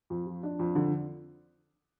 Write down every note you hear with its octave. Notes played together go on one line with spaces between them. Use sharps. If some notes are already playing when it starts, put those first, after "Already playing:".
F2
F3
D4
F2
D3